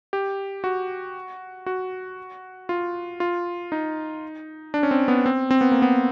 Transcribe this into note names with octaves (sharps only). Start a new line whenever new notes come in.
G4
F#4
F#4
F4
F4
D#4
D4
C#4
C4
B3
C4
C4
B3
A#3
B3